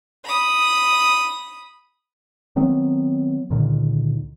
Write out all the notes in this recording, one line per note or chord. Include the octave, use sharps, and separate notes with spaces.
B5 D#6
D#3 F#3 B3 C4
C#2 A#2 D3 D#3